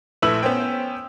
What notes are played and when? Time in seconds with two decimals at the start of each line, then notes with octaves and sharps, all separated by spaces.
0.22 A#1 A3 E4 B4 E6 F#7
0.43 B3 C#4 C5 G5